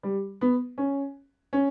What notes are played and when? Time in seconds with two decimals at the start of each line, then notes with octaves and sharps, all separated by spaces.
0.03 G3
0.41 B3
0.78 C#4
1.53 C#4